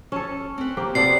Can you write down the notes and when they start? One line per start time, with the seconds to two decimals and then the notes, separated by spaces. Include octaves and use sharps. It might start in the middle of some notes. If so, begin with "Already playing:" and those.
0.12 C#4 A4 A5
0.58 C4 B4
0.77 A#3 G4 C5
0.95 C3 B3 C4 F#4 A4 D5 C7